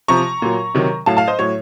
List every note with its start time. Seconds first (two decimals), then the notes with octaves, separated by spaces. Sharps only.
0.08 C3 F3 A#5 C#6
0.42 A#2 F#3
0.75 C3 D#3 F#3
1.06 A2 F#3 F5 A5
1.17 F5 A5
1.27 C5 D#5
1.39 A2 F#3 C#5